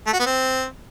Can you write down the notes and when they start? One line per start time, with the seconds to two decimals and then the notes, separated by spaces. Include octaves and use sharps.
0.07 A3
0.13 F#4
0.20 B3
0.26 C4